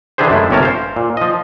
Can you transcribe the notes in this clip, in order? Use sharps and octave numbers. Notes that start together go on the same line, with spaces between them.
D3 E3 D4 G4 G#4 C5
F#2 G#3 A3 E4
G1 C3 C#4 A#4 A5
C5 F5
A#2
F3 D#5